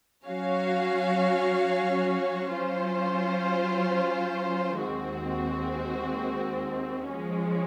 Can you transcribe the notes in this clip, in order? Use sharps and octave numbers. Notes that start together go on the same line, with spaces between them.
F#3 C#4 F#4 C#5 F5
F#3 C#4 F4 C5
D#2 D#3 G#3 C4 F#4
F3 G#3 C#4